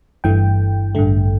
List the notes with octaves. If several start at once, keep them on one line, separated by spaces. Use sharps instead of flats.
G1 G2 E3 A3 G5
A1 G2 D3 A3